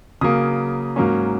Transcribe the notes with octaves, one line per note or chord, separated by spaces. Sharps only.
C#3 F#3 A#3 D#6
G#2 F#3 A#3 C#4